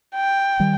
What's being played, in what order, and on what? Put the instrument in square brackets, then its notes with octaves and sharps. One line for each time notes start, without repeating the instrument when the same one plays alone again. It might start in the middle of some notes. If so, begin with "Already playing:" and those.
[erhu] G5
[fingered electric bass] D#3 G3